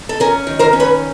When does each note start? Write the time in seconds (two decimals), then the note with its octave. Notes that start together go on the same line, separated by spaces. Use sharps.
0.09 A4
0.20 C#4 G#4 A#4
0.47 D#3
0.59 A#4 C5
0.73 C#4
0.80 B4 C#5